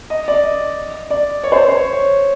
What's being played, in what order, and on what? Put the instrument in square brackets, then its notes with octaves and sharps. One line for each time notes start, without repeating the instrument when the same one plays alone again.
[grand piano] D#5
D5
D#5
D5
C#5
C5
C5
C#5
C#5